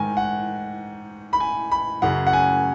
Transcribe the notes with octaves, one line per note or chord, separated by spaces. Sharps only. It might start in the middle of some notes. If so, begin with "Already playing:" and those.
Already playing: G#2 D#3 G#5
F#5
B5
G#5
B5
F#2 C#3 F#5
F#5
G#5